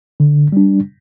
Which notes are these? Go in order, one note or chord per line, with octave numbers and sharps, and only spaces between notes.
D3
G3 D4